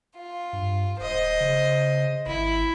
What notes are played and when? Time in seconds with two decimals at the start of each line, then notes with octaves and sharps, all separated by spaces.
0.18 F4
0.53 G2
1.00 D1 C5 D#5
1.40 C#3
2.26 G#1 E4